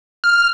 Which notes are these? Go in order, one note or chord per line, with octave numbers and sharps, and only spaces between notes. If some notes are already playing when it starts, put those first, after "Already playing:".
F6